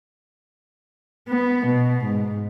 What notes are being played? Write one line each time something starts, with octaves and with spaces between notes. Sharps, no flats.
B3
B2
G#2